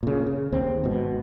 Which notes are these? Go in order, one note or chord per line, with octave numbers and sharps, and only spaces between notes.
A#2 C#3
C#3
D#2 C4
G#1 B2